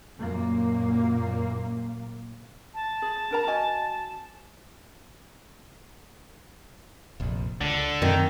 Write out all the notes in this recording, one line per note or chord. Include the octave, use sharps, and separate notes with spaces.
F#2 A#2 A#3
A5
G#4
D4 A#4 A#5
F#4 D#5 G#5
F1 A#1
C#2 D3
F#2 D#3 C4